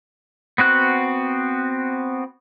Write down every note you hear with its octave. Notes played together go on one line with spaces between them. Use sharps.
B3 C4 F#4 F#6